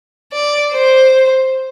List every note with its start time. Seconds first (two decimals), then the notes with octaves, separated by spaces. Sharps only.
0.33 D5
0.73 C5